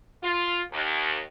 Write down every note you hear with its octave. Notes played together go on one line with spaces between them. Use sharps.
F4
D#2